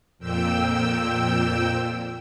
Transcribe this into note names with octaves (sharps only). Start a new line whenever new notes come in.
F2 A#2 G5 E6